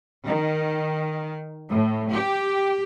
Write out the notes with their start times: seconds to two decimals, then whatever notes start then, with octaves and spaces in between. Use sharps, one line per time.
0.26 D#3
1.70 A2
2.10 G4